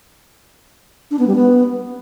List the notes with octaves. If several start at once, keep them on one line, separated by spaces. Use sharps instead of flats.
D4
B3
G3
B3